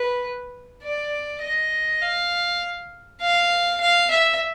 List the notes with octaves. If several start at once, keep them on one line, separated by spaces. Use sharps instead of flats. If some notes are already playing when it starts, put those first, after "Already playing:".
Already playing: B4
D5
D#5
F5
F5
F5
E5